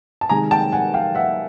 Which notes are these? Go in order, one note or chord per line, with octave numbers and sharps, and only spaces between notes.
A5
C3 D#3 G#3 G#5 A#5
G5 A5
F#5 G#5
F5 G5
E5 F#5